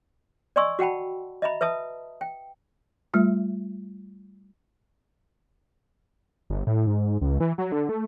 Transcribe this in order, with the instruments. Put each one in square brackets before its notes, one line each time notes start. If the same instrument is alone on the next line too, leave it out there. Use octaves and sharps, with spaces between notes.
[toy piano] D5 D#5 G#5 C6 C#6 E6
F#4 F#5 G5 A5 B5
D#5 E5 A#5 B5
B4 E5 A5 D#6
G5
[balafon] G3 A3 F4
[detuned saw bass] G1
A2
G#2
C#2
E3
F#3
D3
A3